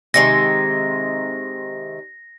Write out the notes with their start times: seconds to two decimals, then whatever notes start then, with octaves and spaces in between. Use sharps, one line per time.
0.14 C3 D#3 G#3 A#6